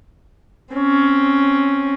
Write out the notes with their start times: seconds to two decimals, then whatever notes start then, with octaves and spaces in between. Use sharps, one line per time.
0.74 C4 C#4